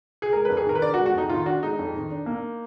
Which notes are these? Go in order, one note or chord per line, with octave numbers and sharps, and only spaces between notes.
G#4
G#3 A#4
F2 B4
G#4
D#3 A#4
B4
D4 D5
F#4
G#3
F#4
F2 D#4
D#3 F4
D4 F#4
G#3 D#4
F2
D#3
D4
A#3